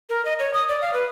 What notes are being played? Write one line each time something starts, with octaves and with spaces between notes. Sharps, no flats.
A#4
D#5
C#5
D#6
D5
F5
B4